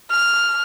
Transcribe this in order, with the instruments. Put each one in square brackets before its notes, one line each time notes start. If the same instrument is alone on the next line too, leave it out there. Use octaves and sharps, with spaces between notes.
[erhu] F6